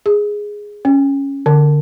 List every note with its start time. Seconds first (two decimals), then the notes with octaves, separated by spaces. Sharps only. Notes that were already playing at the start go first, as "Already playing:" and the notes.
0.06 G#4
0.85 C#4
1.46 D3